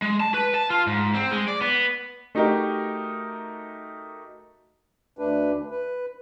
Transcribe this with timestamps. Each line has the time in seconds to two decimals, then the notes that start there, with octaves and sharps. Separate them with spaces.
0.02 G#3
0.20 A5
0.34 B4
0.54 A5
0.70 F4
0.87 G#2
1.14 C4
1.31 G#3
1.48 D5
1.61 B3
2.35 A3 D#4 F#4 G4 A#4 D#5
5.19 D2 A3 D4 B4
5.71 B4